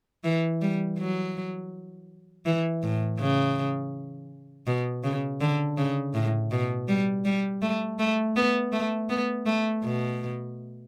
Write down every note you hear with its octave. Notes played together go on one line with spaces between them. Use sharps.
E3
G3
F#3
E3
A2
C#3
B2
C#3
D3
C#3
A2
B2
G3
G3
A3
A3
B3
A3
B3
A3
B2